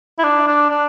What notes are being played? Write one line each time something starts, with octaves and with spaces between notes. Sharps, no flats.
E4
D4
D4
D4